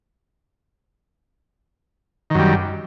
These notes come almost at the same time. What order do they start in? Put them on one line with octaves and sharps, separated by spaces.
D#3 F#2 G3